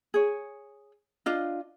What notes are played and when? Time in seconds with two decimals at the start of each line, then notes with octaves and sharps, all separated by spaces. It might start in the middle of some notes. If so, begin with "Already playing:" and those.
0.14 G#4 C#5
1.26 D4 F4 D#5